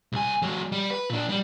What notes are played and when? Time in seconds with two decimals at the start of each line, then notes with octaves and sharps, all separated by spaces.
0.13 C2 G#5
0.42 F#3 G#3
0.72 G3
0.90 B4
1.10 A#2 D4
1.29 G3